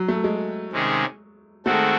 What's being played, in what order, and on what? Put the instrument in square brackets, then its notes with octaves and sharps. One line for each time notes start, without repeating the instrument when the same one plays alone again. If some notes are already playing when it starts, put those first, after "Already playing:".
Already playing: [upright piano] F#3
A3
G#3
[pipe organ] C3 D#3 G#3 C#4 G#4
[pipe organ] D#3 G#3 C4 F#4 A4 [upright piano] A3